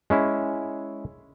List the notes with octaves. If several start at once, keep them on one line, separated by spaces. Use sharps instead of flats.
G#3 C#4 E4